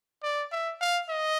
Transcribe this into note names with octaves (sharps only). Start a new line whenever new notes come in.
D5
E5
F5
D#5